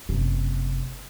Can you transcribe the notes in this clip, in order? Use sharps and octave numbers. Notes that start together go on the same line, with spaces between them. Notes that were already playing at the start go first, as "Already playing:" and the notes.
F#1 C3